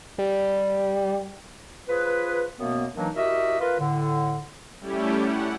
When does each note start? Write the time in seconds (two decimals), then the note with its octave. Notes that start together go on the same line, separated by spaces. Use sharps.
0.18 G3
1.89 F3 F4 G#4 B4
2.60 F#2 B2 A#3 B3
2.96 D#3 E3 F#3 A#3 D4 D#4
3.16 E4 F#4 G4 A#4 D#5 E5
3.60 F4 A#4 B4
3.80 A2 D3
4.80 G3 A3 C#4 E4 G4
5.19 F#5